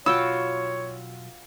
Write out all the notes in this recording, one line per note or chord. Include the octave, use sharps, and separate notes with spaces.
B1 F4 F#4 C#5 G5 B5 E6